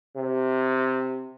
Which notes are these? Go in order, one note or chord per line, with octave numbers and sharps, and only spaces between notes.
C3